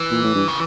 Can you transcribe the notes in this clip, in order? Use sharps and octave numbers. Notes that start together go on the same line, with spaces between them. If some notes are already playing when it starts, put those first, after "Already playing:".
Already playing: E3
A#2
A2
G2
C#3